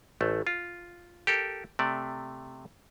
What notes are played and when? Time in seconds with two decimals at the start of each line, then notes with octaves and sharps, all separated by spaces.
0.21 A1 A3
0.47 F4
1.27 G4 A4 A#4
1.79 C3 A3 D5